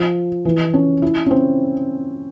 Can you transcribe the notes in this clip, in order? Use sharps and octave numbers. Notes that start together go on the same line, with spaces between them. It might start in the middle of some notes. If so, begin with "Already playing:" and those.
Already playing: F3
E3
C#4
E4
C#4
C4